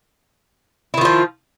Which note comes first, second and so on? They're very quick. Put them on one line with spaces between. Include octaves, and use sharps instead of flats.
E4 D#3 F4 F3